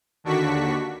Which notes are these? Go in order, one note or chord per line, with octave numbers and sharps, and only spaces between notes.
D#2 D3 D4 F#4 C#6 B6